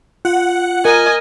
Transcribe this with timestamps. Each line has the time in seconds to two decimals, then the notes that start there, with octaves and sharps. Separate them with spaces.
0.25 F4 F#5
0.85 A#4 D#5 G#5